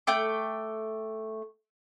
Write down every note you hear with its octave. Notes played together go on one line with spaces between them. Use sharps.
A3 G5 D6